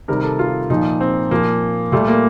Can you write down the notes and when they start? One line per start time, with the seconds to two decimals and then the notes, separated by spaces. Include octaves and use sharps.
0.08 C3 D#3 G3 A#4
0.24 A4
0.39 F4
0.70 A#2 F3 D#4
1.00 C4
1.31 A#2 F3 A#3
1.92 A#2 G3 A3
2.08 A#3